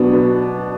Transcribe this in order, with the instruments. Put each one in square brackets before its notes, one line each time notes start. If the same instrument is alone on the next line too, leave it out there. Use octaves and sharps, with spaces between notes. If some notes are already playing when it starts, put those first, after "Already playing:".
Already playing: [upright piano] B2 F#3 B3 D4